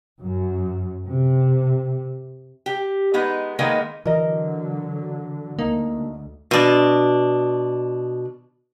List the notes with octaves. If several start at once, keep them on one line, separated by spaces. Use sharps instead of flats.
F#2
C3
G4
G#3 B3 D#4 B4
D#3 G#3 A#3 B3 D#4
D3 E3 F#3 A#4 D#5
D2 A#3 D#4
B2 D4